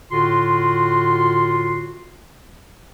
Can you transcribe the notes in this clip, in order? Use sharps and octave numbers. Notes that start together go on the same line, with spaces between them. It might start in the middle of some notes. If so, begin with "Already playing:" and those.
A2 D3 F4 F#4 C6